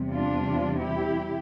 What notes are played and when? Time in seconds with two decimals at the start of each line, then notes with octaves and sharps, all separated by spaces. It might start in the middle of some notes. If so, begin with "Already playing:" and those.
Already playing: E2 C3 G3
0.12 D4 F4
0.79 E4 G4